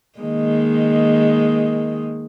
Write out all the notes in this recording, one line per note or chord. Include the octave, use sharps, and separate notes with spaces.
D#3 G#3 A#3